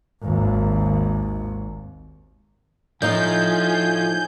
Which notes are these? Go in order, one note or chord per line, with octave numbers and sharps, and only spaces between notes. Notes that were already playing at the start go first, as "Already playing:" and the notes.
G#1 D#2
A2 F3 D#4 G#5 G6